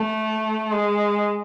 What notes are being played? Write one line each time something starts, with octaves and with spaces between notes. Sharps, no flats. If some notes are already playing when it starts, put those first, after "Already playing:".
Already playing: A3
G#3